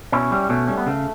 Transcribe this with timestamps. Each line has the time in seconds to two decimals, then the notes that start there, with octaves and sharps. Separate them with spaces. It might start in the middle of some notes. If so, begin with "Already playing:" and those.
0.12 B2 C#4 E4
0.32 G3
0.49 B2 A3 C#4
0.67 G3 C#4
0.77 B3
0.86 C#3 A3